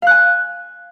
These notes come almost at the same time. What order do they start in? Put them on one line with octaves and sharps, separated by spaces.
F5 F#6 G#5